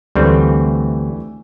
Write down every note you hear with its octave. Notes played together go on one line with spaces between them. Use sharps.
D2 E3 G3 A3 C4